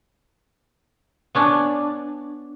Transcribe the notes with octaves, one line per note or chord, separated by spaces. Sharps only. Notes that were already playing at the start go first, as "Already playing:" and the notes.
B3 C#4 D4